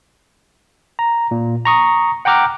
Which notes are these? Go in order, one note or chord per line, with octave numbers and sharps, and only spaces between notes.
A#5
A#2
A#5 C#6 D#6
F#5 G5 A#5 D6 F6 F#6